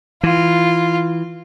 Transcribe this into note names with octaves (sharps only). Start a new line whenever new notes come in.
E3 F4